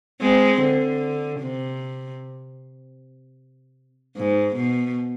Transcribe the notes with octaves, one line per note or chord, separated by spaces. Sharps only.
G#3 C4
D3
C3
G#2
B2